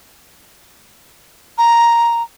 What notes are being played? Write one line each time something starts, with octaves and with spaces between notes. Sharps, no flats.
A#5